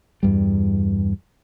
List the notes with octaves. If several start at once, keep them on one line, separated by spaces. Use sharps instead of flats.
E2 G2 G3